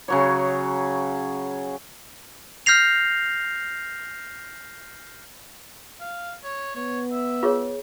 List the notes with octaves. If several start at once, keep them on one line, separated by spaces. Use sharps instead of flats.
C#3 F#3 C#5
F6 G6 A#6 C7 F7
F5
C#5
B3 C#5
E5
F4 G#4 C#5